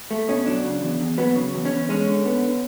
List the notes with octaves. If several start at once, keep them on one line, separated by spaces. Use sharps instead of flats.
A3
B2 C#4
F#3 D4
C#3
E2
E2
F#3 B3
C#3
E2
C#4
E2
G#3 C#4
D3
B3